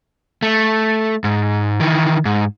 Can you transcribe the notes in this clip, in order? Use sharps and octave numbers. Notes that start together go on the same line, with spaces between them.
A3
G#2
D#3 E3
G#2